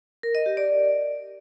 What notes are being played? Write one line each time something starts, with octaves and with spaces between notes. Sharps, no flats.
A#4
D#5
G4
D5